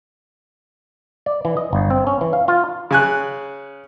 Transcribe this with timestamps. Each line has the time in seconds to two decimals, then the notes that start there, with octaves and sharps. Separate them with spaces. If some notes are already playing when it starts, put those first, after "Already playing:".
1.26 D5
1.45 E3
1.57 D#5
1.73 G1
1.90 C4
2.07 C#4
2.21 E3
2.33 F5
2.48 F4
2.91 C#3 G#5 F#6